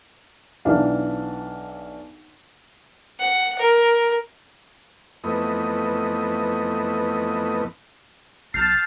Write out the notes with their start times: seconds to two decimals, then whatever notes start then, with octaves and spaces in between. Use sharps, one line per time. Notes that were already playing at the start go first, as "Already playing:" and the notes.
0.65 B1 E3 D4 F5
3.19 F#5
3.58 A#4
5.24 F2 E3 A3 B3 D#5
8.54 B1 A5 F6 G6 C7 F7